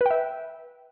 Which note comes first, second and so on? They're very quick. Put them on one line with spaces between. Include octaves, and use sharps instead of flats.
B4 G5 E5